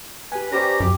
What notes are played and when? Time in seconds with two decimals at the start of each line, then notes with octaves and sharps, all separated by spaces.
0.32 G4 B4 G#5
0.52 C#4 G4 B4 C5 D5 A#5
0.80 F#2 G4